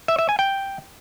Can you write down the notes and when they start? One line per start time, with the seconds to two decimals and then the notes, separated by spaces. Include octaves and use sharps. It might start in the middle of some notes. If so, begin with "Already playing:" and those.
0.08 E5
0.19 E5
0.29 G#5
0.39 G5